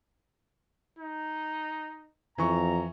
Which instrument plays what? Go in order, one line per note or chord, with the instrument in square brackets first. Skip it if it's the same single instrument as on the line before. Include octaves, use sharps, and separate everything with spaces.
[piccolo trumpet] D#4
[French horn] F2 [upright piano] E3 C#6 [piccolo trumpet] A#5